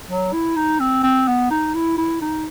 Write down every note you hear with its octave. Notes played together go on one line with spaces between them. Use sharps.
F#3
E4
D#4
C4
C4
B3
D#4
E4
E4
D#4